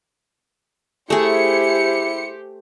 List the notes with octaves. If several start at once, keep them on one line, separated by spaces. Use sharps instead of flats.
A3 E4 G4 G#4 C5 C#7